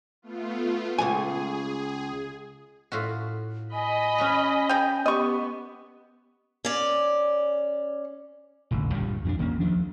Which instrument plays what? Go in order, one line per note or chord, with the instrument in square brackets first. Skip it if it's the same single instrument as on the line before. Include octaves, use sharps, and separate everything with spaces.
[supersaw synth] A3 B3 F4
[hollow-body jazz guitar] C#2 F3 G#5 [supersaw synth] G#4
[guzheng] A2 F4 F#4
[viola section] D#5 B5 [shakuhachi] G#5
[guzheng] C#4 F#4 A#5
[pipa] C#3 G5
[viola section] B3 [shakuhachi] G4 [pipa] D#5 C#6
[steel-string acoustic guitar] C#4 D5
[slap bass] E1 A1 D3
C#2 G2 A#2 G3
F2 C#4 D4
E1 D#3 A#3 C#4
D2 F3 D4